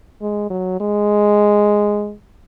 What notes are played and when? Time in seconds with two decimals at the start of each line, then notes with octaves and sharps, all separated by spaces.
0.22 G#3
0.50 F#3
0.80 G#3